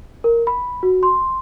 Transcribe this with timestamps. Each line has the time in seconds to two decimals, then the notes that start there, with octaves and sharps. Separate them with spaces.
0.24 A#4
0.47 B5
0.83 F#4
1.03 C6